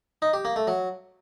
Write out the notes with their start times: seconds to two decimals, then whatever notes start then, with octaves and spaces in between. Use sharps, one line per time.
0.22 D#4
0.33 G4
0.45 A#3
0.56 A3
0.67 F#3